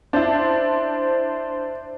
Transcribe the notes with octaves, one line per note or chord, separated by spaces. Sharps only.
D4 E4 C5